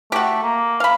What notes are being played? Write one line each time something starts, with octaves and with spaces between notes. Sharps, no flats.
A3 F#4 G4
A#3
F5 B5